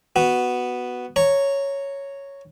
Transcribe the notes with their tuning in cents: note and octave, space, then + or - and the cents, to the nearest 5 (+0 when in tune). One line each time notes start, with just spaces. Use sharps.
B3 +0 F#4 +0
C#5 +0 A#5 -15